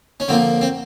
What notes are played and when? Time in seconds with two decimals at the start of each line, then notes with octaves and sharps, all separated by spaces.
0.20 C#4
0.28 D3 F3 A#3 C4
0.61 C4